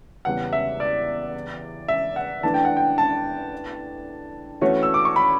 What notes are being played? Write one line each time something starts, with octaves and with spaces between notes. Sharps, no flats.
E2 C#3 G3 B3 F#5
E5
D5
E5
F#5
E3 A3 D4 A5
G5
F#5
G5
A5
E3 A3 C#4 F#4 C#5
E6
D6
C#6
B5